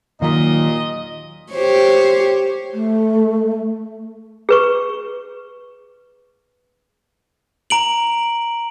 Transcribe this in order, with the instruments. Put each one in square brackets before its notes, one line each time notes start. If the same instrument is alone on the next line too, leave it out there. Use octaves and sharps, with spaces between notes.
[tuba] D#2 [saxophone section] A#2 [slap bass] D#3 F#3 [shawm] D#5
[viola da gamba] G4 C5 C#5
[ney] A3
[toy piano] G#4 B4 C#6
[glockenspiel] A#5 D7 F#7